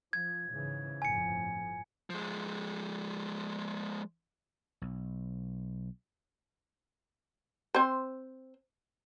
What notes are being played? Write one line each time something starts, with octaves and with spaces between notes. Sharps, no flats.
F3 G#6
G#2 C#3 E3
G1 F2 A2 G#5 C#7
F3 G#3
B1
C4 C5